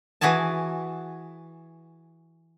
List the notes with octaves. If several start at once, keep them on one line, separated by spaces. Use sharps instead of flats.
E3 F#4 G#4 G#5 A5